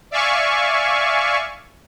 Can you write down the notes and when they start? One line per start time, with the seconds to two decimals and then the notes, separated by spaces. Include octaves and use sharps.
0.11 D5 E5 F5 G#5 C#6